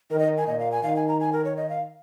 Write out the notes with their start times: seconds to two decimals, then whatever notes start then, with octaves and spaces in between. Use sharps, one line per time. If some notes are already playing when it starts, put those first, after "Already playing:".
0.11 D#3 A#4
0.19 D#5
0.37 G#5
0.47 A#2 D#5
0.59 F5
0.72 G#5
0.83 D#3 F5
0.96 G#5
1.08 A#5
1.20 G#5
1.33 A#4
1.45 C#5
1.57 D#5
1.69 F5